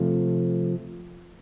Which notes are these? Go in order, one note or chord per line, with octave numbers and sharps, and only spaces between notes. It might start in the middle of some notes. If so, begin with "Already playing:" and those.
Already playing: C3 F3 A3